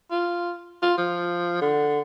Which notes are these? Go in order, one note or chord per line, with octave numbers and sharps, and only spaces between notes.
F4
F4
F3
D3